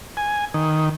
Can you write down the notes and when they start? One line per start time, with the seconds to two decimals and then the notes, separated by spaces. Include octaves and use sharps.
0.17 G#5
0.54 D#3